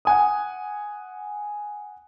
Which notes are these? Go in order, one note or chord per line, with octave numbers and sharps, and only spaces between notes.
F#5 G#5 D#6